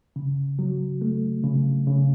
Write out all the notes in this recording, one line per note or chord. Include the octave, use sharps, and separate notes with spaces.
C#3
F#3
A3
C#3
C#3